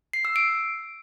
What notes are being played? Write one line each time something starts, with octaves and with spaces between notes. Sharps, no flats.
C7
E6
D7